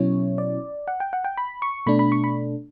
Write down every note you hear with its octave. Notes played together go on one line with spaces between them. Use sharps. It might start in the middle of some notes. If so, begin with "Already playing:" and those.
Already playing: B2 F#3 C#4 E4 C#5
D5
F#5
G5
F#5
G5
B5
C#6
B2 A3 D4 B5
B5
C#6
B5